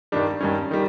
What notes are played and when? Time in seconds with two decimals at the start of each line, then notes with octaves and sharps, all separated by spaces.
0.12 G2 D#3 G3 D4
0.40 G2 D#3 G3 C#4
0.71 D#3 G3